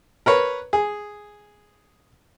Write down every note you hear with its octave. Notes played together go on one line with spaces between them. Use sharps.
A#4 B4 C#5
G#4